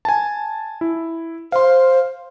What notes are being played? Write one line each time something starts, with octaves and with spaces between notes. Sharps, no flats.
G#5 A5
E4
C5 F5 C6